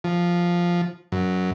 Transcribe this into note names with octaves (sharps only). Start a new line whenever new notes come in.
F3
F#2